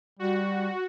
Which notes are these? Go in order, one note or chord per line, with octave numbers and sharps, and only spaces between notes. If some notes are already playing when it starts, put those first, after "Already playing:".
G3 F#4